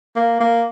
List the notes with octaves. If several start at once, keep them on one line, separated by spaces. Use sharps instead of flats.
A#3
A#3